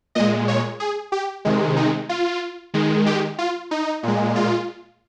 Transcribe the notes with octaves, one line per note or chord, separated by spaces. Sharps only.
A#2 G#3 D#5
C#5
G#4
G4
C3 D#3 G#3
D#4
F4
D#3 G#3
G4
F4
D#4
A#2 G#3
F4